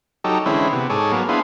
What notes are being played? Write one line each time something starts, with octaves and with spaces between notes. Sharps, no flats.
F#3 D#4 G4 A4
D3 E3 G#3 C4 C#4 E4
C3 B3
G#2 G#4 A4 C#5 D6
F#3 A#3 B3
B3 D4 E4 F4 G#4 C5